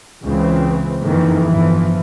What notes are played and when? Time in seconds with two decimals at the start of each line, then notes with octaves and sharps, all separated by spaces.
0.24 C#2 C#3 E3 C4
1.03 F#1 F2 D#3 E3
1.48 G1 E3 F3